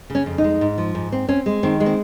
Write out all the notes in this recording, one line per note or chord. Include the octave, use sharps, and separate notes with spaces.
C#3
C#4
F2
D#4
G#3
G#2
F3
G#2
C4
C4 C#4
G#3
D#3 C4
G#3
C4